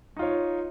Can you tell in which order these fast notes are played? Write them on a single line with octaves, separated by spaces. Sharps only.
D#4 F4 C#5